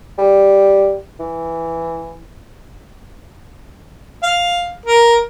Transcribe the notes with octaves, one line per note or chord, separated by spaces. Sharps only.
G3
E3
F5
A#4